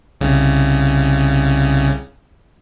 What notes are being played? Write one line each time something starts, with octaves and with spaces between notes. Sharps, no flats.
C2 C#3